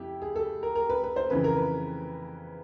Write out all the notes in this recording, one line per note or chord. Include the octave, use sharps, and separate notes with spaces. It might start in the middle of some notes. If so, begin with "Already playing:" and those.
Already playing: F2 E4 G4
G#4
A4
A#4
A#4
B4
B4
C5
F2 C#3 E3 B4
A#4
B4